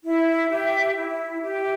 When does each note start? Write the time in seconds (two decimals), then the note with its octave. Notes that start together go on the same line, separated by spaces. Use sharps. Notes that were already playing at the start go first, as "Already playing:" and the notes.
0.04 E4
0.50 G4 E5
0.96 E4
1.41 G4 E5